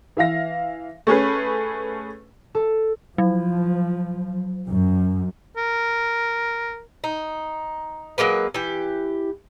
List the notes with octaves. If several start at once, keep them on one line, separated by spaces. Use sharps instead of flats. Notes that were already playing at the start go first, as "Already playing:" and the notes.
E3 E5 F5 A#6
A3 C#4 G#4 B4
A4
F3 F#3
F#2
A#4
D#4
F#3 G#3 A#3 B4
E3 G4